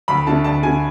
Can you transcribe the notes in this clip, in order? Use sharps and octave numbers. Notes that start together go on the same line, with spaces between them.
D2 B5
D3 A3 A5
D2 A5
D3 A3 G#5